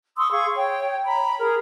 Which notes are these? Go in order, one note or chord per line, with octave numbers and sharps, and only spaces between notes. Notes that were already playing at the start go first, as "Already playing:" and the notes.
C6 C#6 D#6 E6
G#4 F5 C#6
C#5 G5
A#5 B5
G#4 A#4